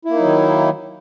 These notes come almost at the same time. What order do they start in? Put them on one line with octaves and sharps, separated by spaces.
E4 A#3 D#4 F#3 D#3